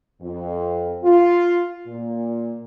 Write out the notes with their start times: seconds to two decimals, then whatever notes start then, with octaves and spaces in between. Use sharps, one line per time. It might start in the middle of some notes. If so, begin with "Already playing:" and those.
0.21 F2
1.03 F4
1.87 A#2